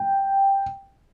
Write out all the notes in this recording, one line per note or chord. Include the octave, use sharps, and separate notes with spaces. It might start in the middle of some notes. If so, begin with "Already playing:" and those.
Already playing: G5